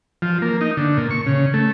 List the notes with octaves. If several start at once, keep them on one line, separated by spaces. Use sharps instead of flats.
F3
A#3
D#4
D3
A#2
C#6
C#3
A3